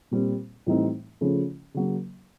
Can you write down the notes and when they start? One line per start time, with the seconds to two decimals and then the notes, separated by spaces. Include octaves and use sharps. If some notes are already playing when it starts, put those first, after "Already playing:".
0.11 A#2 G3 C4
0.66 A2 E3 G3 C4 D#4
1.21 C#3 F3 A3 C#4
1.74 C#3 F#3 A#3